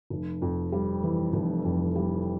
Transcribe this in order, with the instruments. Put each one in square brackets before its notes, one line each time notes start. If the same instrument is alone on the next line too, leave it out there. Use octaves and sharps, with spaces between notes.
[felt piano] F1
F2
G3
E3
F1
F2
G3